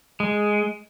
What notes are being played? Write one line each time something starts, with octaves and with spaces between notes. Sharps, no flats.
G#3